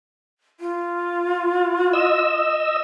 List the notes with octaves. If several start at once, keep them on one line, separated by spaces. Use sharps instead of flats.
F4
D#5 E6